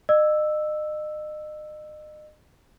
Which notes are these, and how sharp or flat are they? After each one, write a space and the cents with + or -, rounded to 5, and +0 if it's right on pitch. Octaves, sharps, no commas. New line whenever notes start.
D#5 -35 E6 +0